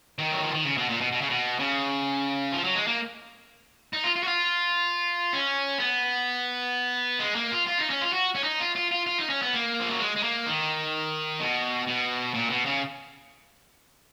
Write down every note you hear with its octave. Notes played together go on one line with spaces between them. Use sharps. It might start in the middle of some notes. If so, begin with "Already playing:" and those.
D#3
F#3
F3
D#3
C#3
B2
A#2
B2
B2
C#3
B2
C#3
F3
F#3
G#3
A#3
D#4
F4
F4
F#4
F4
C#4
B3
G#3
A#3
F4
F4
D#4
C#4
F4
F#4
C#4
D#4
F4
F4
F4
F4
D#4
C#4
B3
A#3
F3
F#3
G#3
G#3
A#3
D#3
B2
B2
A#2
B2
C#3